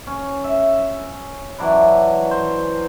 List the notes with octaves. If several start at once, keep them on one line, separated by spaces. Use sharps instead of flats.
C#4
E5
E3 F#3 D4 E4
C5